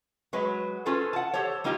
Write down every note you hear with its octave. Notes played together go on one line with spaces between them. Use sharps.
F#3 G#3 B4
C#4 F4 G#4 A4 B4 C5
F#5 A5
G4 A4 C5 C#5
G3 A#3 D#4 F4 G4